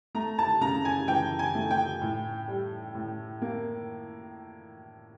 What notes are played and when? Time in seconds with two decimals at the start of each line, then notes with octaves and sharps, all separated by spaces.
0.15 A3 A#5
0.38 A5
0.61 C#3 A#5
0.85 G#5
1.08 E3 G5
1.39 G#5
1.55 A3
1.71 G5
2.02 A2
2.48 G3
2.95 A2
3.42 A#3